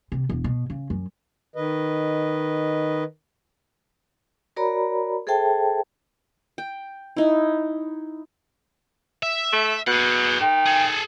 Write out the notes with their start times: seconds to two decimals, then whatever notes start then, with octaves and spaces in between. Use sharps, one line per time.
0.12 C3
0.29 E1
0.44 B2
0.70 C#3
0.90 F#2
1.56 D#3 B4 D#5
4.56 F#4 A#4 C#5 D5 A#5 B5
5.27 G#4 A4 C5 E5 G5 A5
6.58 G5
7.17 D#4 E4
9.23 E5
9.53 A3
9.87 B2 G#4 F#5
10.40 D#3 G5
10.66 G#4 A4